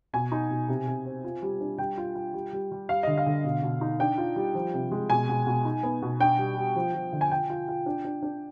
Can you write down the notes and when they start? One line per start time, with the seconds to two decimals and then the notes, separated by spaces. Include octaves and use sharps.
0.13 B2 G#5
0.32 D#4
0.51 B2
0.68 C3
0.87 C3
1.05 C4
1.24 F4
1.42 G3
1.61 D4
1.78 G3 G5
1.98 F4
2.15 F4
2.34 G3
2.53 G3
2.72 G3
2.89 G3 F5
3.03 D3 D#5
3.18 F5
3.26 D3
3.44 B2
3.63 B2
3.81 D#4
4.00 D4 G5
4.18 F4
4.36 G3
4.55 F3
4.74 C3
4.91 G#3
5.10 B2 G#5
5.29 B2
5.47 B2
5.65 D#4
5.83 B3
6.02 B2
6.20 D4 G5
6.38 G3
6.57 G3
6.76 F3
6.95 F3
7.13 D3
7.21 G#5
7.30 F4 G5
7.50 F4
7.68 F4
7.86 D4
8.05 D4
8.23 D4